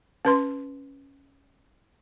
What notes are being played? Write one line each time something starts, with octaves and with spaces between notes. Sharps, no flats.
C#4 B4 C6